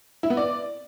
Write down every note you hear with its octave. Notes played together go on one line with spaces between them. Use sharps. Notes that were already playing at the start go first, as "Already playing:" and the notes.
E4
B3
D5